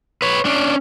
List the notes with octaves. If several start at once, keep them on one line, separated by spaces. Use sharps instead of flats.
B4 C#5
C#4 D4